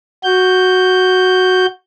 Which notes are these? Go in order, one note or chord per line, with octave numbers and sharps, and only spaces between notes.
F#4 G6